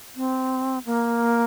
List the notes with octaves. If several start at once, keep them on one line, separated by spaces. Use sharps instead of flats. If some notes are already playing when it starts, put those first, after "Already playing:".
C4
A#3